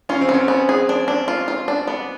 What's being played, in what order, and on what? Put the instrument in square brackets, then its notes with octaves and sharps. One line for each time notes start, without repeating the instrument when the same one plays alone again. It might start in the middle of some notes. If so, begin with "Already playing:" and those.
[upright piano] C#4 [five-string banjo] F4
[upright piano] C4
[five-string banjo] B3
[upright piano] C#4
[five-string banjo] B3
G#4
D4
D4
F4
F4
D4
B3